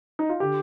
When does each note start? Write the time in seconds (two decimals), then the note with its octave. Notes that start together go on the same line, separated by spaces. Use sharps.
0.19 D#4
0.29 F4
0.40 D3 G4